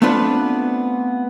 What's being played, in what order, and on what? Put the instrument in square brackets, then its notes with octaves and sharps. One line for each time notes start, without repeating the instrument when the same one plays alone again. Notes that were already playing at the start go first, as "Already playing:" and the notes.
[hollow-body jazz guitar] A3 B3 C4 D4 F4 B4